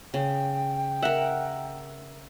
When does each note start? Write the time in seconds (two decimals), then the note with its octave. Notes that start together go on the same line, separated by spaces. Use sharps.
0.14 C#3 G5
1.02 A#4 E5 F#5